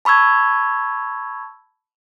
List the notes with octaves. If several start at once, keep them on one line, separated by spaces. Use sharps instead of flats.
A5 B5 C#6 E6 G#6